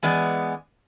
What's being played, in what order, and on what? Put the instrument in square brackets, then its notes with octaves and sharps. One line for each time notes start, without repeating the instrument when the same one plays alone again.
[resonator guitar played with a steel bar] E3 G#3 B3 D5